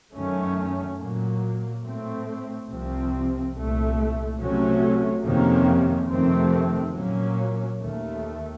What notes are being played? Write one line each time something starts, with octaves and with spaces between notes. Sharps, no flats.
F#2 D#3 A3 C#4
A#2 F#3 A#3
A2 A3 C4
C2 C3 F3 C4
C2 A#2 A3
C3 F#3 A3 C#4
F2 C3 D#3 A#3 C#4
F2 C3 D#3 A3 C4
A#2 F#3 A#3 C#4
D#2 D#3 A3